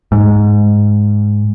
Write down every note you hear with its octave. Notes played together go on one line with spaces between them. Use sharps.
G#2